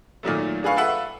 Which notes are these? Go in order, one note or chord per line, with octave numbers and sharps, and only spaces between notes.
A#2 D#3 F#3 A3
D4 G#4 B4 F5 C#6
F4 A4 B4 E5 F#5 B5